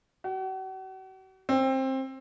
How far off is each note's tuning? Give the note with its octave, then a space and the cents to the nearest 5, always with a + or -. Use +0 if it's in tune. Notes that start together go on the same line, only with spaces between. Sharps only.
F#4 +40
C4 +20